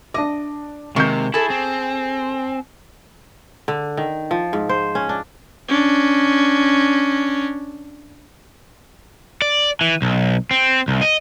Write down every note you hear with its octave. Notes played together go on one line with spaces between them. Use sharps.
D4 D#5 D6
C3 D#3 G#3 A#3 C4 C#6 G6
E4 G#4 A4 G#5
C4
D3
D#3
F3
G#2
C5
C#4
D4
C#4 D4
D5
E3
B1
C4
C2
D#5